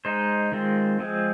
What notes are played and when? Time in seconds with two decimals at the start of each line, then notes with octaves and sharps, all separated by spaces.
0.05 G#3 D#4 C5
0.52 D#3 G#3 C4 F4
1.00 F3 G#3 C4 G#4